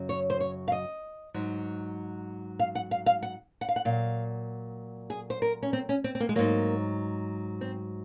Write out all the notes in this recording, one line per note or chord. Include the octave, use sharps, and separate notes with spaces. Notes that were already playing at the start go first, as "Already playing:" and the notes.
Already playing: F#2 C#3 F#3
C#5
C5
C#5
F5
D#5
G#2 F#3
F5
F#5
F5
F5
F#5
F#5
F5
F#5
A#2 F#3 F5
G#4
C5
A#4
C#4
C4
C#4
C4
C4
A#3
G#3
G#2 F#3 A#3
C4